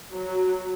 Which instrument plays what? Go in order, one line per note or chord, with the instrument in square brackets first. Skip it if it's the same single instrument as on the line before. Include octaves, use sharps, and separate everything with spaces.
[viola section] F#3